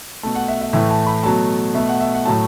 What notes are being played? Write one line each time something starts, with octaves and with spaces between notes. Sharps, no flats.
B2 A3 A5
F#5
E5
E5
A2 E3 A3 E5
A5
B5
B2 F#3 A3 A5
B2 A3 E5
F#5
E5
F#5
A2 F#3 A3 A5